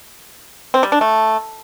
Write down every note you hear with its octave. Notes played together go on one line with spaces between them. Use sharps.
C4
G3
D4
A3